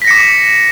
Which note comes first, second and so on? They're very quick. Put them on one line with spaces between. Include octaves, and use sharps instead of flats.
B6 A#6 C#7 D6